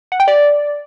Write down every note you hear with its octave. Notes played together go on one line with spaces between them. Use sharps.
F#5
G5
D5